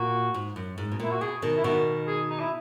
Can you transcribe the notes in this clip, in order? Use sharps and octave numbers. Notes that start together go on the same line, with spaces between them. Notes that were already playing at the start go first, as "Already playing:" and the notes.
Already playing: A#2 F#4
G#2
F#2
G#2
B2
A#2 E4
F#4
B2 G#4
B2 D#3
E4
B2 D#3 F#4
G#4
D#4
E4